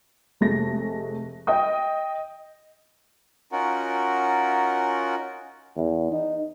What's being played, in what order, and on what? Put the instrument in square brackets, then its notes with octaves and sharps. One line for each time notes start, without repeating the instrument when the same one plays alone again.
[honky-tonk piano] F1 G#3 A3 A#6
D#5 G5 D#6
[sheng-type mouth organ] C#4 D#4 F4 F#4 A#4 F#5
[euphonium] E2
D#4